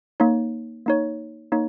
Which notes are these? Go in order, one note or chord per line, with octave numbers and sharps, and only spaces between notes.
A#3 D#4 C#5
A#3 D#4 C#5
A#3 D#4 C#5